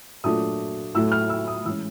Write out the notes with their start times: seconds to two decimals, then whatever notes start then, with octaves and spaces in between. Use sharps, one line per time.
0.24 A#2 F#3 A3 D4 D#6
0.95 A2 F#3 A3 E6
1.12 F6
1.29 E6
1.48 D#6
1.65 E3 G#3 C#4 E6